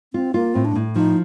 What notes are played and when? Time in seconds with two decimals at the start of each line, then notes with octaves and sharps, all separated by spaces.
0.13 C4 F4
0.34 A#3 F4
0.54 A2 C4
0.65 D4
0.75 A2
0.96 F3 D#4